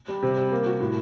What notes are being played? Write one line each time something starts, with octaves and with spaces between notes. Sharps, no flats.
G3
C3
G3
A#3
F#4
A2